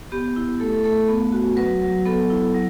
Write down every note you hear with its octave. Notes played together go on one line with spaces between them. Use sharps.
B3 G4
E4
A3 A4
A4
A3 A4
B3
F#4
F#3 B4
F#3
B3 A4
E4
F#3